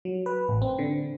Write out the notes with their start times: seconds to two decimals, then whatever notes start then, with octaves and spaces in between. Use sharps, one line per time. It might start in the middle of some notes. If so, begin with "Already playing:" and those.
0.05 F#3
0.26 B4
0.49 A1
0.62 C4
0.79 D3